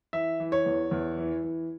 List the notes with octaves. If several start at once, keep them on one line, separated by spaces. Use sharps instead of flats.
E3 E5
E3
C#5
E2
E2
E3
E3